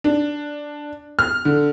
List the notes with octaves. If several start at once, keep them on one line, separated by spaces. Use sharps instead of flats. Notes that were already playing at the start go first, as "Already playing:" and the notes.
D4
F6
D3